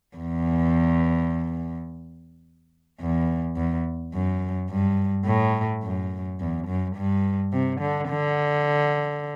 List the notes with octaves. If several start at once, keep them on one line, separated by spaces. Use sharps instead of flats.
E2
E2
E2
F#2
G2
A2
F#2
E2
F#2
G2
C3
D3
D3